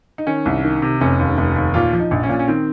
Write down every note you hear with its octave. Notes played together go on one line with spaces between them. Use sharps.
D#4
D#3 C#4
C2
D#3
C3
F1 C#4
D#2
F1
D#2
A#2 F4
F3
D#4
A#1
C#4
A#2
C#4
D#3 C4